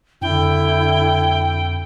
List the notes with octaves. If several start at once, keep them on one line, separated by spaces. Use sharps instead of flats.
F2 D3 E4 G5